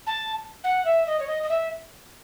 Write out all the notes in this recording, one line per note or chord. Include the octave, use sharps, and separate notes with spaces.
A5
F#5
E5
D#5
C#5
D#5
D#5
E5